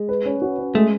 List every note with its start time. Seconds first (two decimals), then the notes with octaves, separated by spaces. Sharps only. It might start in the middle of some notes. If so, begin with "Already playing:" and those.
Already playing: G#3
0.09 B4
0.26 C#4
0.42 F#4
0.58 C#4
0.74 G#3 A3